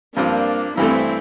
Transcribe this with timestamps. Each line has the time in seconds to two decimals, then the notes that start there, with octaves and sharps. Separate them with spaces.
0.17 G2 F3 A#3 C4 D4 F4
0.77 G2 E3 A3 C4 E4